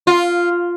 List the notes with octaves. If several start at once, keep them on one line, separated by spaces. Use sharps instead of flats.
F4